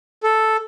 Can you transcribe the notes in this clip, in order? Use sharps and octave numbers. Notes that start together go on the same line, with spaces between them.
A4